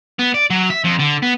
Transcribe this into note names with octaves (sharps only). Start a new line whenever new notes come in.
B3
D5
F#3
E5
F2
D3
B3